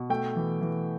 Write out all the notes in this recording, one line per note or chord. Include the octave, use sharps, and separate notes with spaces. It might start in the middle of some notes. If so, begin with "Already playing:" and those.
Already playing: B2
A3 G5
E3
E3